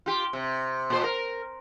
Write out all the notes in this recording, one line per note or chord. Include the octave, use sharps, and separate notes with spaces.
F4 G4
C3
A#2 C5
A#4